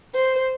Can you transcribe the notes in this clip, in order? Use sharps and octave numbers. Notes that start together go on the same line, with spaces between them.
C5